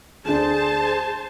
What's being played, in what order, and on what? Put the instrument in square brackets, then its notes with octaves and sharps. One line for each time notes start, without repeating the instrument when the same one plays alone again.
[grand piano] D2 D4 [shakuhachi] G#4 [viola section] C5 A5